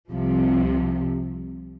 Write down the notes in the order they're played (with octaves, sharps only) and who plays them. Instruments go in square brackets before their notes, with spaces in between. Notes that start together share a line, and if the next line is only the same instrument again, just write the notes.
[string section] C2 C3 F3